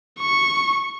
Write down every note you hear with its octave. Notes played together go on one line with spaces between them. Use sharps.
C#6